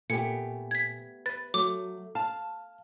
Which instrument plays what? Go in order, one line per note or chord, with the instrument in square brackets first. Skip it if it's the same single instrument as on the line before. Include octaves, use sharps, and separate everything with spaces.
[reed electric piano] A#2 G#5 [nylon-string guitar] A3 B3 G4 [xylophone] C#7
[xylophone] G#6 B6
[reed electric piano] B4 [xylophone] A6
[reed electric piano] F#3 [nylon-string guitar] A3 [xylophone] D6
[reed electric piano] F5 [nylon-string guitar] A5